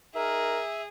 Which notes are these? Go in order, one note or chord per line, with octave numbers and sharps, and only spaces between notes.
D#4 G#4 A#4 E5